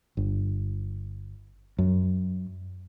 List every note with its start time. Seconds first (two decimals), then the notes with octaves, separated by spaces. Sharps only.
0.17 G1
1.79 F#2